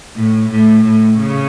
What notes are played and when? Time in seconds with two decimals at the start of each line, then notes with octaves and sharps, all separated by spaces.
0.16 A2
0.50 A2
0.84 A2
1.18 C#3